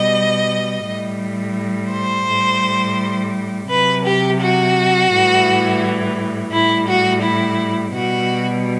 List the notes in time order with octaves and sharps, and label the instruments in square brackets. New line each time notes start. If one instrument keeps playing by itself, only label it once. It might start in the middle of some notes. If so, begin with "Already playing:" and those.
Already playing: [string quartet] B2 G3 D#5
A2 G3
C5
A2 G3
C3 F#3 B4
G4
F#4
A2 E3 G3
A2 G3 E4
F#4
E4
B2 G3 F#4